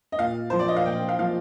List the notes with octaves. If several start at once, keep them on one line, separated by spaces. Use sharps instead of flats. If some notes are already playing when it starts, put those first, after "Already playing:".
D#5
A#2 F5
F3 C5
D5
D#5
F5
A#2 G5
F5
F3 F5